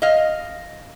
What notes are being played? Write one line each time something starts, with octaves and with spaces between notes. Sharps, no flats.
D#5 F5